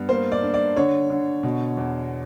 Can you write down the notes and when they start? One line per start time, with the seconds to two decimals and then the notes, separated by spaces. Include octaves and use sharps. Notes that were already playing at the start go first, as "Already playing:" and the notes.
Already playing: G2 B3
0.09 A#3 C5
0.32 D5
0.43 D4
0.54 D5
0.77 D3 C#5
1.10 D3
1.43 B2
1.77 E2